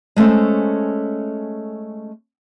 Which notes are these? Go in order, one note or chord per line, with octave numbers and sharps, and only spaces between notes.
G#3 A3 C#4 A4 C5